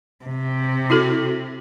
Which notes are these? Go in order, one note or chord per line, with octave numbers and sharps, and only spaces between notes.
C3
E4 F#4 A4